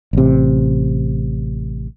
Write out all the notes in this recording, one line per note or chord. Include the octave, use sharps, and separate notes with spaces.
A1 C3